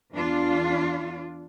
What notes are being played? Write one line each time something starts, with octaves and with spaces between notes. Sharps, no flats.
E2 D4 F4